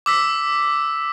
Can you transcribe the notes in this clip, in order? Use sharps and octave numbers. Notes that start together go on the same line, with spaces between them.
D6 E6 B6